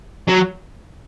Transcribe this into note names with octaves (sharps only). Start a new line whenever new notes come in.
F#3